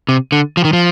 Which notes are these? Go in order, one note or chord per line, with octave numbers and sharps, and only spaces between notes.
C3
D3
F3
D#3
F3